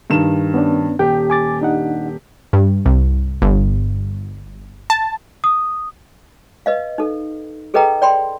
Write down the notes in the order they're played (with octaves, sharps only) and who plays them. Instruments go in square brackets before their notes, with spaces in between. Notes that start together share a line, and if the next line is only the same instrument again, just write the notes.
[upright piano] G2 D#3 E7
[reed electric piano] B3 C#4 D4
[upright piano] D#1 G4 [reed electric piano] G5
[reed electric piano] G#5 D6 A6
D4 D#4 F#5
[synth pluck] G2
C2
G1
A5
[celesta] D#6
[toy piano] B4 D#5 F5
D#4 A4
G#4 A4 B4 D#5 G5 A#5
D5 G5 B5 C6